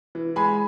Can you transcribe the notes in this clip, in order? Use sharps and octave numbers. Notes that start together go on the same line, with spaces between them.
E3
G#3 G#5 B5